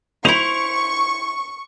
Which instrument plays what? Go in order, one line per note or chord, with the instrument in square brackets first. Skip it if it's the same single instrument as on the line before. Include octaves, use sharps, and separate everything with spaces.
[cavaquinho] E4 C5 [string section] C#6 [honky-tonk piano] F7